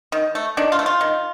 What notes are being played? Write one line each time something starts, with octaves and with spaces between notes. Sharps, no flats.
D#3
A3
D#3 D4
F4
A3
F4
D#3